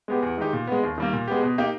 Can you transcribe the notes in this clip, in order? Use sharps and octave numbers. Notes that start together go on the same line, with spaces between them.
G#3 B3 G4
E2
D#3 G#3 D#4 G4
A#2
G#3 B3
D#2
D#3 G3 A#3
A#2
G#3 B3 G4
B2
A#3 D#4 G4